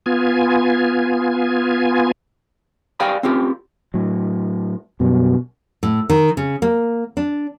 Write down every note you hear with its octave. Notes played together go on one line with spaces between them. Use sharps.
B3 F4 G#5
G4 D5 F5 G5 G#5 B5
C4 C#4 F4 G4
A2 F#3
F#2 B2 F#3 G3
A2
D#3
C#3
A#3
D4